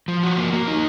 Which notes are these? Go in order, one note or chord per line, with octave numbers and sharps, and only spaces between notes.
F3
F#4
A#3
A#3
D#4